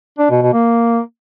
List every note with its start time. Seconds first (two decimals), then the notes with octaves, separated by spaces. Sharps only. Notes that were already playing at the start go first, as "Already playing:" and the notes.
0.18 D4
0.30 B2
0.42 B2
0.53 A#3